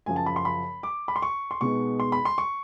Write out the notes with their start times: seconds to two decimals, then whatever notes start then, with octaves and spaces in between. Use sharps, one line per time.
0.06 F#2 C#3 F3 G#5
0.16 A5
0.26 B5
0.36 C6
0.45 B5
0.83 D6
1.08 B5
1.16 C6
1.22 C#6
1.51 C6
1.61 B2 G#3 B3 D#4 C#6
2.00 C6
2.12 B5
2.25 C6
2.38 C#6